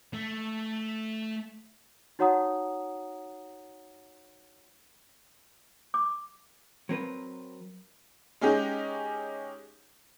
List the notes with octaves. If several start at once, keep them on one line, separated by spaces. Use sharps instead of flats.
A3
D#4 F#4 C#5 F#5 A#5 D#6
D6
F#3 C4 A#4 B4
G#3 C#4 D#4 G4